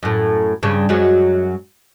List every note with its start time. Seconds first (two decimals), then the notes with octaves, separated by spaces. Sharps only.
0.03 F#2 A2
0.63 G2 C#3
0.89 F#2 F#3 G#3